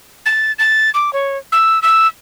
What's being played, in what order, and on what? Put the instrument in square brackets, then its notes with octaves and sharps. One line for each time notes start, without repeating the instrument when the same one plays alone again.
[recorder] A6
A6
D6
C#5
E6
E6